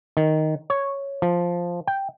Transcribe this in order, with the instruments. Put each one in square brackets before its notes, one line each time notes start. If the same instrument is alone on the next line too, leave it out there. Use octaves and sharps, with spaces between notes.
[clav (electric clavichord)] D#3
C#5
F3
G5